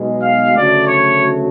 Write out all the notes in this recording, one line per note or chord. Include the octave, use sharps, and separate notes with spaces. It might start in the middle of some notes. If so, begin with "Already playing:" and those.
Already playing: B1 B2 G#3
F5
D2 C#3 F#3 A3 D5
C#5